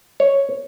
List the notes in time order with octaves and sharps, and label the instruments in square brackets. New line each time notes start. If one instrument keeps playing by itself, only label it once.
[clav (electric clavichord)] C#5